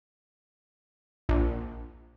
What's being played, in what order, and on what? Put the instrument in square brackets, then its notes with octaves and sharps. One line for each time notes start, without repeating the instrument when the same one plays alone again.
[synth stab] A#1